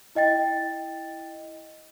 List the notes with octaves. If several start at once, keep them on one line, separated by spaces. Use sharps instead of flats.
E4 D#5 G5 A6